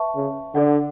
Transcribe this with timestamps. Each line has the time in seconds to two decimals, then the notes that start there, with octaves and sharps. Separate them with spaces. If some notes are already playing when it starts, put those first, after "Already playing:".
Already playing: B4 E5 A5 C#6
0.16 C#3
0.55 D3 A4 D5 F#5